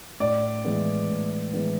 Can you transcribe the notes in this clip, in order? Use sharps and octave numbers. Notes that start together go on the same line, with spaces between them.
A2 D5
E3 G#3 B3
A2
E3 G#3 B3